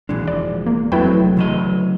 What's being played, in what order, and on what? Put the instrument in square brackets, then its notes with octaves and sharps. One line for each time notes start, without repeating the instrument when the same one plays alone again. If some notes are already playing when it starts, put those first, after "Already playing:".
[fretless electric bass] D#2 A#2 D4 [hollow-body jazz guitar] E3 G#3
[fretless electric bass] F1 F3 [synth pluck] D5
[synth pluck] A#3
[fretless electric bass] F2 G#3 C4 [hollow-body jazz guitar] F#3 A3 [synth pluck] E4 B4 G5
[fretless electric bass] F1
[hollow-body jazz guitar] D2 F#3 D#5 [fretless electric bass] C#3 E3 A3